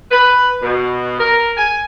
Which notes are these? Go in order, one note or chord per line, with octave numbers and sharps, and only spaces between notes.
B4
B2
A#4
G#5